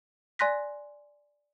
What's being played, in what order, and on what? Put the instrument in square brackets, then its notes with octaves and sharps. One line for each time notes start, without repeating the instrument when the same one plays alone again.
[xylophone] D5 G#5 C6 F#6 A#6 B6